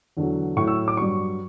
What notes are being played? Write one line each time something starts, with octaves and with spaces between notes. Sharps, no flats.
E2 D3 F#3
A2 F#3 C#6
E6
D6
G2 F#3 C#6